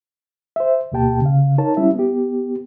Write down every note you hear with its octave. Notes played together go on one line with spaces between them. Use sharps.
C5 E5
D2 B2 A#3 G4 G5 A5
C#3 F5
D#4 A#4 C#5 A5
G3 C#4 E4 E5
B3 G4